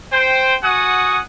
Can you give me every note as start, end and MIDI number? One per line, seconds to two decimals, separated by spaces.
0.11 0.54 72
0.11 0.54 79
0.63 1.19 66
0.63 1.19 78
0.63 1.19 80
0.63 1.19 87